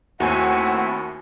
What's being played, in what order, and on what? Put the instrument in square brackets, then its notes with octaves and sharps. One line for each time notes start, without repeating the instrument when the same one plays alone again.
[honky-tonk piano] D#2 G#5 [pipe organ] A3 C4 E4 [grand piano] F#4 [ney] F#5